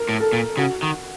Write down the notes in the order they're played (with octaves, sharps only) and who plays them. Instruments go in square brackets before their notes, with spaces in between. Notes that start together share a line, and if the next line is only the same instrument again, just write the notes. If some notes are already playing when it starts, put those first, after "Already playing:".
Already playing: [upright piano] A#4
[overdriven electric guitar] A2
[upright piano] A4
[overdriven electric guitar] A#2
[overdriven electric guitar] C#3 [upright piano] F#4
[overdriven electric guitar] D#3